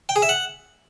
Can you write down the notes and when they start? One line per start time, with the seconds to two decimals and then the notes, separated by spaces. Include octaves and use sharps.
0.09 G5
0.16 G#4
0.22 E5
0.29 F#5